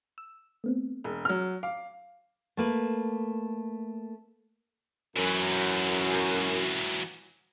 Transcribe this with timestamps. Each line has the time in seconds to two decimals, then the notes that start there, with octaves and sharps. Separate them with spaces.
0.18 E6
0.64 A3 B3 C4
1.04 E1
1.25 F#3 F6
1.63 F5 D6
2.57 A3 A#3 B4
5.17 F#2 E3 F#3